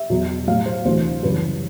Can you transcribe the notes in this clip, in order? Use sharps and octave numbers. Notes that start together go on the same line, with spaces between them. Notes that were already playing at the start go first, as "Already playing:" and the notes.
Already playing: E5
E2 B2 F#3
A2 F#3 F5
C5
D2 C3 E3 C5
F#2 C#3 E3 G3 B4